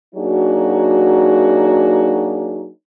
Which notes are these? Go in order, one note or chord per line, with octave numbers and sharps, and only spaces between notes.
F#3 A#3 D4 D#4 F#4 G#4